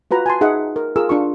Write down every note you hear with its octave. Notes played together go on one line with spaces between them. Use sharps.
F4 F#4 B4 A#5
G#5 A5 C6
D#4 G#4 E5 F#5
A#4
F4 G#4 A#4 E6
D4 F4 C#6